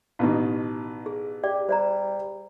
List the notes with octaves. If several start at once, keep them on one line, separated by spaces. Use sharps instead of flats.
A1 B2 D#3
G#4
G4 D5
G3 C5 D5 A#5